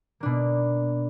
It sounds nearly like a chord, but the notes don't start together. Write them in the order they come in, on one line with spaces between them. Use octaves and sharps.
A#3 D4 B2